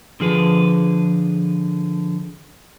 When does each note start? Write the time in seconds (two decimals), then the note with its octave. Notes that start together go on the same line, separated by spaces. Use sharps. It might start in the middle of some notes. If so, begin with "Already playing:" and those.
0.20 D3 F3 G#4 B4